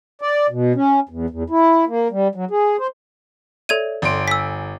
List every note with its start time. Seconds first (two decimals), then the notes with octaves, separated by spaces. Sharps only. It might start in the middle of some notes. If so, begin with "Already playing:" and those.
0.21 D5
0.50 B2
0.75 C#4
1.09 E2
1.30 E2
1.50 E4
1.87 A#3
2.11 G3
2.35 F#3
2.51 G#4
2.79 C5
3.69 A4 C#5 D5 E5 G#6 D#7
4.02 G1 D5 C6 D7
4.28 G#5 E6 B6